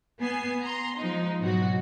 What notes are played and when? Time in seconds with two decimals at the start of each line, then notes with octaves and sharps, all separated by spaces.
0.19 B3 G#5 C7
0.62 A#5 C6
0.97 F3 G#3 D#4
1.39 G#2 B2 F#3 F#4